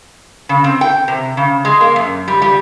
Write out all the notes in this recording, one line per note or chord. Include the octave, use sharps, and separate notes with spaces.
C#3
C4
G5
C3
C#3
G#3
A#3
F#2
G3
G3